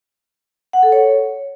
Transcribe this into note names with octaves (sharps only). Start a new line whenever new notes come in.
F#5
A4
C#5